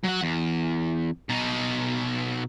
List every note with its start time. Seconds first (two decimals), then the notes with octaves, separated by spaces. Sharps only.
0.04 F#3 F#5
0.22 E2
1.29 B2 D#4